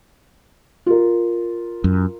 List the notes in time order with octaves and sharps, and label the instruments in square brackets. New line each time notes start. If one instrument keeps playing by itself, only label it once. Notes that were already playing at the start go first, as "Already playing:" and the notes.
[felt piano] F4 A#4
[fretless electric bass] F#2